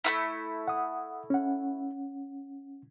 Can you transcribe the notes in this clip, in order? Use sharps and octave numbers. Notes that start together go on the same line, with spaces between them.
A3 A#3 E4
F#5 D#6
C#4 F#5